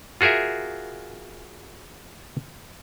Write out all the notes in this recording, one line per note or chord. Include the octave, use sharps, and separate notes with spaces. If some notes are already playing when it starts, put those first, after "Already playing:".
F4 F#4 G#4 A#4 E5